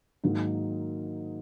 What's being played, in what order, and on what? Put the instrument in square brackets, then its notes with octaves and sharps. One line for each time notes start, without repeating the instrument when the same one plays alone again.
[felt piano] G#2 D#3 F#3 A#3